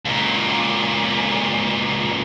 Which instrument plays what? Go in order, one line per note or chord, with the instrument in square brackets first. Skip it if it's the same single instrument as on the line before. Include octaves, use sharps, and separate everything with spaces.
[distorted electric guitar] C#2 A#2